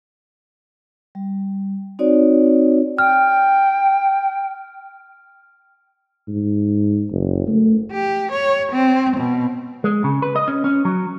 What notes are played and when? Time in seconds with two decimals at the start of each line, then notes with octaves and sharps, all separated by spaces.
1.15 G3
1.99 C4 D#4 F#4 C#5 D5
2.99 G5 F6
6.28 G#2
7.11 F#1
7.48 A3
7.92 G4
8.32 C#5
8.72 C4
9.17 B2
9.84 G#3
10.04 C#3
10.22 B4
10.36 D#5
10.48 C#4
10.64 C#4
10.85 F#3